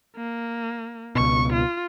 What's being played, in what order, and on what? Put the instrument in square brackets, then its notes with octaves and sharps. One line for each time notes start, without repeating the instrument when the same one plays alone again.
[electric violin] A#3
[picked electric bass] C#2 B2 [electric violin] C#6
[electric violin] F4